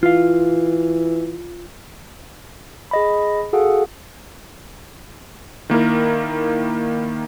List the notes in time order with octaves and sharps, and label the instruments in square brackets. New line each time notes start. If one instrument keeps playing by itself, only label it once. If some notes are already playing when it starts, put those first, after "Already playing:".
[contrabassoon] E3 [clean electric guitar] F4 F5
[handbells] G#4 D#5 B5
F#4 G#4 A4 F5 F#5
[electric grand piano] D#3 A#3 E4 A#4